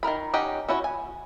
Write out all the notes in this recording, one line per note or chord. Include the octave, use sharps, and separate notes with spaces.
D#3 F3 A#4 B5
C#4 D#4 G4 F#5 G5
C#4 E4 F#4 C#5
G#5